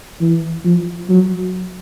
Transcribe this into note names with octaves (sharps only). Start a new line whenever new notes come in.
E3
F3
F#3